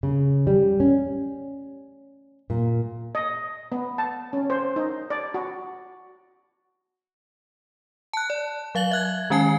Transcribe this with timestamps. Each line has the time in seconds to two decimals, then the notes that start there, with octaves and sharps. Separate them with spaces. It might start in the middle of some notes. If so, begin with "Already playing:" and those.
0.03 C#3
0.47 G3
0.80 C#4
2.50 A#2
3.15 D#5
3.72 B3
3.98 A5
4.33 C#4
4.50 C5
4.76 D#4
5.10 D5
5.34 F#4
8.13 A5 F#6
8.30 D5
8.75 F#3 F5 A6 F#7 G7
8.91 E5 F#6 G#6
9.30 D#3 G#3 C#4 G#5 A5 C7